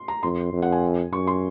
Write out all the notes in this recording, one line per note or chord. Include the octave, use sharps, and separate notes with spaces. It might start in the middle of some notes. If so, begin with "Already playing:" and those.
Already playing: C6
A#5
F2 C6
F2
F#5
G#5
F#2 C#6
C6